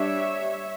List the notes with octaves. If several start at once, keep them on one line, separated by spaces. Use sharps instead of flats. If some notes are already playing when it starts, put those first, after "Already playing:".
Already playing: G3 D4 C#5 E5